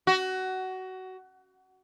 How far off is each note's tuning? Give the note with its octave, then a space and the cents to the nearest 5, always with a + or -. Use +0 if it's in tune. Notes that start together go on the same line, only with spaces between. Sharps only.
F#4 +20